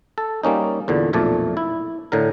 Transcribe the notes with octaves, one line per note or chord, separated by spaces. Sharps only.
A4
G3 A#3 C#4 D#4
E2 A#2 D3
B1 F2 A#2 A3 D5
E4
A2 D3 A#4